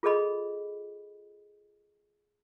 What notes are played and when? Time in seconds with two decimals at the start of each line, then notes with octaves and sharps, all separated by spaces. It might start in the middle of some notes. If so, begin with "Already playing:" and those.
0.03 F4 G#4 A4 D#5 B5